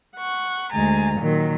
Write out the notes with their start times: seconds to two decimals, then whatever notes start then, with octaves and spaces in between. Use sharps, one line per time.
0.15 F#5 C#6
0.70 D2 G#3 G#5 A#5 A6
1.19 A#2 D#3 F#3